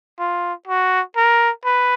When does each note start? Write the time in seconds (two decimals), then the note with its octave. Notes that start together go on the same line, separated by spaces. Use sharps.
0.19 F4
0.67 F#4
1.16 A#4
1.65 B4